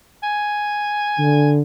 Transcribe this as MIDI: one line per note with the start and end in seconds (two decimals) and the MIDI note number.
0.23 1.52 80
1.19 1.62 50